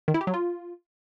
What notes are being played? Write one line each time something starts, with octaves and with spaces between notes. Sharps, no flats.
D#3
E4
G4
F#3
F4